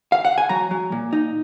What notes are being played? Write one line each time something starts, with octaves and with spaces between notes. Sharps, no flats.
F5
F#5
G#5
F#3 A#5
F#3
A#2
D#4